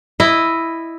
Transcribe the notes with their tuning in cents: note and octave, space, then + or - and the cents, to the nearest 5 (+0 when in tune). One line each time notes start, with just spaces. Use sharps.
E4 +0 D#5 -5